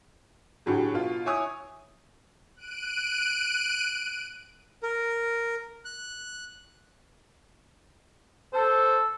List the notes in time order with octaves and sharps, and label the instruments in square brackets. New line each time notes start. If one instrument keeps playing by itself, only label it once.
[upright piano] A2 D3 F#3 G4 G#4
B2 F4
E4 C#5 G#5 C#6 D#6
[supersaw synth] F#6 D7 D#7
[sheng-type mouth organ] A#4
F#6
[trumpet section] A4 [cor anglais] C5